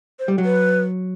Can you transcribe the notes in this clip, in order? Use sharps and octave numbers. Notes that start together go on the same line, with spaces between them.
C5
G3
F#3
B4